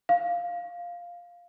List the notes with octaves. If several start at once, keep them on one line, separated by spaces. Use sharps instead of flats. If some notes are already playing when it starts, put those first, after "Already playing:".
F5